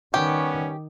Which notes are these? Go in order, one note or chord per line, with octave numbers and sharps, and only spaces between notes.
D#3 G3 B3 C#4 G4